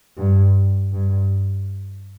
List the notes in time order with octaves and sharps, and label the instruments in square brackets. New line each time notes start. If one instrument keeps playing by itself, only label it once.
[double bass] G2
G2